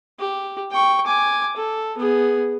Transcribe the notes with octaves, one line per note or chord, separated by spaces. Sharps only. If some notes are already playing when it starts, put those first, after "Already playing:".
G4
G5 C#6
G#5 D6
A4
B3 G#4